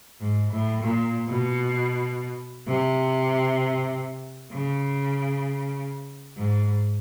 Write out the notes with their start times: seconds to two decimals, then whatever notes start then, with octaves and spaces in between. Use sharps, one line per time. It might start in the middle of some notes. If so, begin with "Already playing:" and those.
0.21 G#2
0.51 A2
0.82 A#2
1.29 B2
2.67 C3
4.52 C#3
6.37 G#2